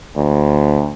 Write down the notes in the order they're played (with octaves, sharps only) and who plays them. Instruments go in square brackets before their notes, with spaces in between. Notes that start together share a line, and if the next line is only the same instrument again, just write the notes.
[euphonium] D2